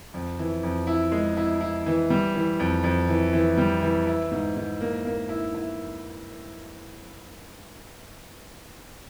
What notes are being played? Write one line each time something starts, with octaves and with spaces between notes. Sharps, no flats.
F2
E3
F2
E4
G#3
E4
E4
E3
G3
E3
F2
F2
E3
E3
G3
E3
E4
G#2
G#2
A#3
A#3
E4
E4